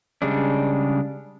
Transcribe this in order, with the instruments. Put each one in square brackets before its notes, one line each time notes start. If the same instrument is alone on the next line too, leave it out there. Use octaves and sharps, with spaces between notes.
[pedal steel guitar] C#3 G3 G#3 D4